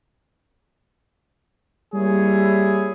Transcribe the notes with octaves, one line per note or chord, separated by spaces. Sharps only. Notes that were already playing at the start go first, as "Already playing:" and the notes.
G3 A#3 E4 G#4 C#5